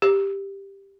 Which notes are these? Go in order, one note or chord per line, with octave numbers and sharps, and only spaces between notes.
G4